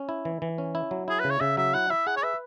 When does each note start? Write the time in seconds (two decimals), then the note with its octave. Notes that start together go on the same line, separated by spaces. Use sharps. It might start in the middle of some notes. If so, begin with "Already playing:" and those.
Already playing: C#4
0.09 E4
0.25 E3
0.42 E3
0.58 C#4
0.75 E4
0.91 F#3
1.08 E4 G#4
1.20 C#3 B4
1.30 C#5
1.40 C#3 E5
1.57 F#3 E5
1.74 E4 F#5
1.90 E4 E5
2.07 G#4 F#5
2.16 C#5
2.23 B4 E5